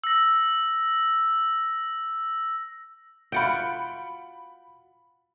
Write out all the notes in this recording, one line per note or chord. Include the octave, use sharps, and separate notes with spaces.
E6 A#6
F4 F#4 G5 B5 C#7 D7